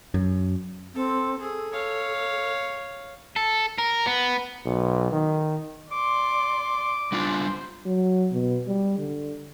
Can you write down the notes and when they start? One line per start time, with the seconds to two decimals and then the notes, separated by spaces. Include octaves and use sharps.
0.14 F#2
0.95 C4 A4
1.40 G#4 A4
1.73 C#5 F5
3.36 A4
3.78 A#4
4.07 B3
4.66 B1
5.12 D#3
5.92 D5 C6 D6
7.12 G3 D4 F4 C5
7.86 F#3
8.33 B2
8.68 G3
8.98 D3